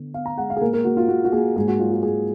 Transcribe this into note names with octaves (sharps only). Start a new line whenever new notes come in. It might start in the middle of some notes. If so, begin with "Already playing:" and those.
Already playing: D3 B3
B3 F5
A#5
G#3 F#5
F5
G#4
A#2 A#4
A#4
A#2 F#4
F4
A#3 F#4
F#4
A#3 G#4
G#2 G#4
F#4
F#3 F4
F#4
G#2 G#4